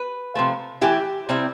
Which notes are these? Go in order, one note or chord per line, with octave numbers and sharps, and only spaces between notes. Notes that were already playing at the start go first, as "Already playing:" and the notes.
Already playing: B4
C3 F3 A3
E3 A3 E4 G4
C3 G3 C4 E4